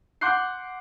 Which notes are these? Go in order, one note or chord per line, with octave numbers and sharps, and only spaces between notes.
F#5 C6 D6 F#6 G6 C7